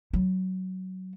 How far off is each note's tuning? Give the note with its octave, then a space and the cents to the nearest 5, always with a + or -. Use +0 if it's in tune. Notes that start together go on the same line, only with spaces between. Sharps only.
F#3 +15